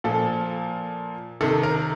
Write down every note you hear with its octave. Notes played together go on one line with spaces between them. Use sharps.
A#2 F3 A4
C3 D#3 A4
A#4